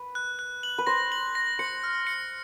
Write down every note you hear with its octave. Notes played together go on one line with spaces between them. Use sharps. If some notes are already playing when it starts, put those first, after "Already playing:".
Already playing: B4
F#6
F#6
F#7
B4
C5 A#6
F#7
A#6
C5 C#7
F6
C#7